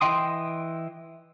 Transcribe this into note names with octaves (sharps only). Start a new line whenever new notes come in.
E3 D#5 G5 C6 D#6